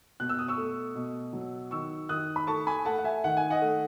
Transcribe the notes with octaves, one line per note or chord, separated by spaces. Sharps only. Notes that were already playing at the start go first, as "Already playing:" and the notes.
B2 F#6
E6
D#6
C#6 E6
A3
B2
F#3
D#3 C#6 E6
D#3 D#6 F#6
B5
A3 A5 C#6
G#5 B5
A3 F#5 A5
F#5
E5 G#5
D#3 F#5
G#5
D#5 F#5
A3